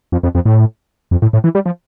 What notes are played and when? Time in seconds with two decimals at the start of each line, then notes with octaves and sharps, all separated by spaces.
0.12 F2
0.23 F2
0.35 F2
0.45 A2
1.11 F2
1.22 A2
1.33 A2
1.44 E3
1.55 G3
1.66 F3